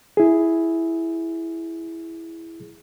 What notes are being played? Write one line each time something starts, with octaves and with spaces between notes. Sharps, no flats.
E4 G#4